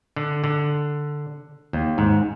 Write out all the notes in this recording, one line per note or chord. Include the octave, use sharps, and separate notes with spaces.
D3
D3
D#2
G#2